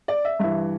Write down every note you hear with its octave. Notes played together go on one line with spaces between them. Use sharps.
D5
E5
G2 E3 E5